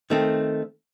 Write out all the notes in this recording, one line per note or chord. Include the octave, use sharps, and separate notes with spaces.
D#3 A3 C4